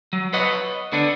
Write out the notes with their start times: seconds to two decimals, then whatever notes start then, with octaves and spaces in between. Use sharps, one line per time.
0.13 F#3
0.33 B4 C#5 D#5 F#5
0.92 D3 B3 D4